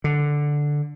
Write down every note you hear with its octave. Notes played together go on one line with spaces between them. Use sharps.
D3